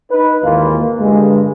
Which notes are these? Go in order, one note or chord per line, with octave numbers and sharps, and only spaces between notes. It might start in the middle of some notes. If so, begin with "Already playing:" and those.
D#4 B4
G#1 D#2 E3 A#3 F4
G2 D3 G#3